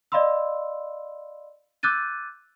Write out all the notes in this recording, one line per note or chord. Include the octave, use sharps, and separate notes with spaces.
D5 D#5 F5 B5 C6 E6
D6 E6 F#6 G6 A6 D#7